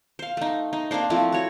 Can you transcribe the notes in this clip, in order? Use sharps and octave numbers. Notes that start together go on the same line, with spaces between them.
C5 F5
A3 D#4
D#4
A#3 C4 D4 C5
F3 A3 C4 E4
F#4 C#5